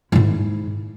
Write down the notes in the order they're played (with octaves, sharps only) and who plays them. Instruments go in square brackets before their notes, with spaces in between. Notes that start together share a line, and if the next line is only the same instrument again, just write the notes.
[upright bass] G#2 E4